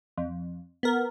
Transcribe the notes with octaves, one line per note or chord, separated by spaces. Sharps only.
F2
B3 A#4